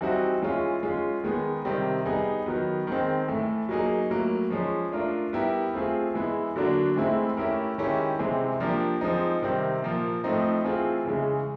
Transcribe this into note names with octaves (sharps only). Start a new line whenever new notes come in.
E3 G3 C4 D#4 F#4
E3 G#3 C#4 F4
G#3 C#4 F4
D#3 G#3 B3
C3 D#3 G3 C4
G3 B3 D#4 G#4
D#3 F#3 B3
D#3 G#3 C4
A2 E3 A3
F#3 A#3 D#4 G#4
A2 F#3 A#3
F3 G#3 C#4
A3 D4 F4 A#4
G3 B3 E4 G4 A#4
A3 C4 F4 G#4
E3 G#3 B3 E4
D3 F#3 A#3 D4 F#4
A2 E3 G#3 C4 E4
A3 C#4 E4 G4 A#4
D#3 G#3 C#4 E4 G4
C3 E3 G#3 C4
F3 A#3 D4 G4 A#4
F3 G#3 C4 D#4
C3 D#3 G3 C4
A#2 F3 A#3
A2 F3 A3 C4 D#4
E3 A3 C4 F4 G#4
C#3 E3 G#3